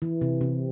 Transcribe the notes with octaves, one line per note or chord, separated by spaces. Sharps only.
E3
C3
C3